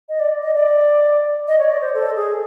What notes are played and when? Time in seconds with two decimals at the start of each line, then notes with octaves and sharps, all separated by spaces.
0.09 D#5
0.20 D5
0.43 D#5
0.55 D5
1.48 D#5
1.59 C#5
1.70 D5
1.81 C5
1.94 A4
2.16 G#4